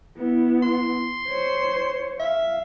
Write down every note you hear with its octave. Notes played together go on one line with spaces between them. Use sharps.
B3 E4
C6
C5 C#5
E5 F5